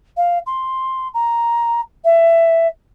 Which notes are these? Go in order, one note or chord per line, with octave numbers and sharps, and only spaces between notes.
F5
C6
A#5
E5